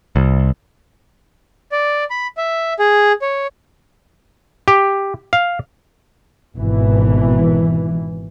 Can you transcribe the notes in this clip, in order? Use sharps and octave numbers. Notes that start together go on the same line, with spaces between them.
C2
D5
B5
E5
G#4
C#5
G4
F5
G#1 B2 E3